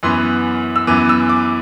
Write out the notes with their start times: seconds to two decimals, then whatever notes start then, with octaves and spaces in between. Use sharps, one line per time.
0.03 F#2 E3 B3 C6
0.76 E6
0.87 F#2 E3 B3 D6
1.09 E6
1.29 D6